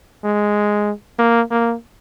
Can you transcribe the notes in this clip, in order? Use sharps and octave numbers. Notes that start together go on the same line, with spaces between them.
G#3
A#3
A#3